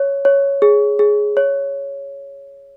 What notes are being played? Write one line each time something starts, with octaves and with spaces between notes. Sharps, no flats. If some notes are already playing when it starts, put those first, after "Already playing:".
Already playing: C#5
C#5
G#4
G#4
C#5